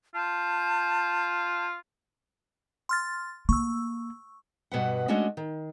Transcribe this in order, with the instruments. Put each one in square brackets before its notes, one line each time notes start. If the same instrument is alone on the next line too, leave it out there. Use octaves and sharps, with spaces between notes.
[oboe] F4 [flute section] A5 G6
[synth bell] C6 F6 A6
[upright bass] A#3 [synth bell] C#6 E6
[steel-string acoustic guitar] G2 B2 B4 F#5
G#3 A3 C#4 D4 F#4 D#5
D#3